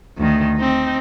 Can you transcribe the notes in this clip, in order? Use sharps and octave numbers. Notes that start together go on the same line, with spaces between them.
D2 D#3
C4 D#4